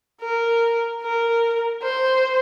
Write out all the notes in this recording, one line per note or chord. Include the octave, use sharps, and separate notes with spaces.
A#4
A#4
C5